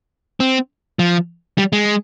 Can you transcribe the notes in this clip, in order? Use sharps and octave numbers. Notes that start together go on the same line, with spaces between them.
C4
F3
G3
G#3